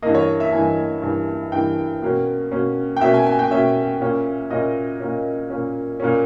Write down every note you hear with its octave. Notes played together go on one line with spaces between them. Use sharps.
G2 E3 A#3 D#5
C#5
E5
G2 E3 A#3 G#5
G2 E3 A#3
G2 E3 A#3 G5
B2 A#3 C#4
B2 A#3 C#4
G5
B2 A#3 C#4 E5
G#5
G#5
G5
B2 A#3 C#4 E5
A#2 A#3 C#4
A#2 A#3 C#4 D#5
A#2 A#3 C#4
A#2 A#3 C#4
A#2 A#3 C#4